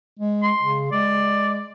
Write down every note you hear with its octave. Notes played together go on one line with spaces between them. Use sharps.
G#3
C6
C#3
G#3 D5